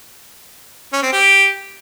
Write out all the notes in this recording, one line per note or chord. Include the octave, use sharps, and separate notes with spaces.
C#4
C4
G4